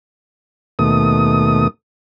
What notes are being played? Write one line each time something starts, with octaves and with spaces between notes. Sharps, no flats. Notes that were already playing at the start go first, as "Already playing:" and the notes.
D#2 B2 A3 D#6